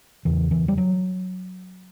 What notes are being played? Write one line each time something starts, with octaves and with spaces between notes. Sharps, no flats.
E2 C#3 E3
E3
G3
F#3